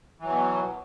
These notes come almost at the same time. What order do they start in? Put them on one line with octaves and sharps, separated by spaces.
E3 F#3 B2